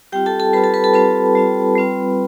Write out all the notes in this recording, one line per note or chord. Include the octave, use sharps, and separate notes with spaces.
G3 C4 F4 G4 G5
A4 A5
A4 A5
G3 C4 F4 B4 B5
A4 A5
B4 B5
A4 A5
G3 C4 F4 B4 B5
G3 C4 F4
G3 C4 F4